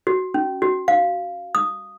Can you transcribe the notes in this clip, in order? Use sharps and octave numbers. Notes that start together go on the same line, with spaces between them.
F#4
C#4
F#4
F5
D#6